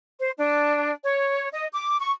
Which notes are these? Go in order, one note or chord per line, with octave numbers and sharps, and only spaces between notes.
C5
D4
C#5
D#5
D6
C#6